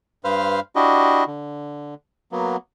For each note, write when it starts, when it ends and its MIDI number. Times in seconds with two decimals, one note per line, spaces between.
0.24 0.60 43
0.24 0.60 71
0.24 0.60 72
0.24 0.60 77
0.24 0.60 89
0.76 1.24 62
0.76 1.24 64
0.76 1.24 66
0.76 1.24 67
0.76 1.24 75
1.27 1.94 50
2.32 2.56 54
2.32 2.56 58
2.32 2.56 59